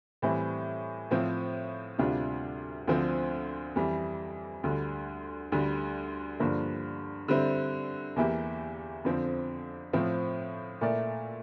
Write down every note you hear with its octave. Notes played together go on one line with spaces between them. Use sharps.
A2 E3 G3 C4 E4
A2 F3 C4
D2 C3 G3 D4 F4
D2 D3 F3 C4
F2 E3 G3
D2 D3 G3
D2 D3 G3
G2 D3 F3 A#3 D4
D3 G3 C4 E4
E2 E3 A#3 E4 G4
F2 D3 F3 C4
A2 F3 C4
A#2 A3 E4 A#4 D5